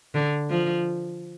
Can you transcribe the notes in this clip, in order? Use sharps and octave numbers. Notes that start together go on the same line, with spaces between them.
D3
F3